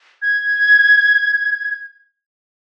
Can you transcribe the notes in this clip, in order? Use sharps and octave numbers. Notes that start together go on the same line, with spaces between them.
G#6